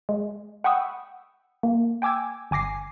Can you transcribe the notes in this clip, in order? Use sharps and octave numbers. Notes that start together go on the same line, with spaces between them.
G#3
F#5 G5 B5 C#6 D#6 E6
A#3
G5 G#5 D6 E6 G#6
G1 G#5 D6 A#6 C7